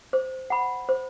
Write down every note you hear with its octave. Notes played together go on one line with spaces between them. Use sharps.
C5
F#5 B5
C5